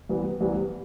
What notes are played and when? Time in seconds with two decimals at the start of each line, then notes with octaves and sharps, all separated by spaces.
0.09 C2 C3 E3 G3 B3
0.41 C2 C3 E3 G3 B3